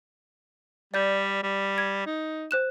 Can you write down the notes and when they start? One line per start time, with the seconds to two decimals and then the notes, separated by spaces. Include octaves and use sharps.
0.94 G3 D5 G6
1.43 G3
1.78 G#6
2.06 D#4
2.51 C5 F#6 E7